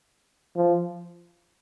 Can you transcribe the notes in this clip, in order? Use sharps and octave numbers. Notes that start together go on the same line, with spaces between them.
F3